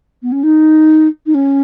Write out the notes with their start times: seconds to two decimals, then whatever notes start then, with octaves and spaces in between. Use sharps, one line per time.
0.22 B3
0.32 C#4
0.43 D#4
1.26 D#4
1.34 C#4